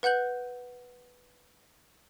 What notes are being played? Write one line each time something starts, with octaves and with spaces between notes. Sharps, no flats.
B4 F#5 F#6 G6 F#7